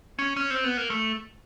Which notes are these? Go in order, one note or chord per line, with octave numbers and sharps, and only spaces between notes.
C#4
C#4
C4
B3
A#3
A3